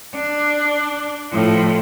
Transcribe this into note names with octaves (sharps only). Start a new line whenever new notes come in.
D4
A2 F3